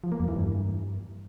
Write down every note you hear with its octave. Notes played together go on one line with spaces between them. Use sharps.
F3
A#3
F2
E3
G2